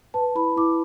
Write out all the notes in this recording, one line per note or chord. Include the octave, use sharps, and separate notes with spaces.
B4 A5
E4 B5
E4 D6